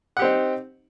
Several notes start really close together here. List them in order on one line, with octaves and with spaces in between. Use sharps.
F#5 G4 C4 D#4